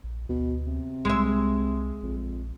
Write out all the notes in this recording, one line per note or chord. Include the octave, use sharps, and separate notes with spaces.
A#1
D2 B2
C3
C2 G#3 E5
A#1 F2